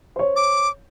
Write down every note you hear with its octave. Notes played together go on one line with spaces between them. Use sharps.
C5 C#5
D6